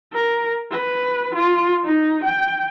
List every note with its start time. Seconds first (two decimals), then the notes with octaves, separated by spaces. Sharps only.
0.13 A#4
0.71 B4
1.35 F4
1.84 D#4
2.24 G5